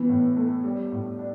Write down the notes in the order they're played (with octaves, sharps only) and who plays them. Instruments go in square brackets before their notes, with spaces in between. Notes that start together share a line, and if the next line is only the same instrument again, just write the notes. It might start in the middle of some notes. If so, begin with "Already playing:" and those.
Already playing: [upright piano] E3 [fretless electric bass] B3
[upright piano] A2
A3
G3
A2
D4